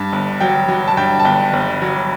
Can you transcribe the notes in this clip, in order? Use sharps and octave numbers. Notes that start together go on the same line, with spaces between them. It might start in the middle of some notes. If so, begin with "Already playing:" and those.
Already playing: G2 A5
G1
F#3 G5
F#3
A5
G2 G5
A5
G1 G5
G1
F#3